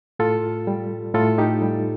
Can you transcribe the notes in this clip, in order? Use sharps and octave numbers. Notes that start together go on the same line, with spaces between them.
A2 F4 A4
G3
A2 F4 A4
D#4 G4
G3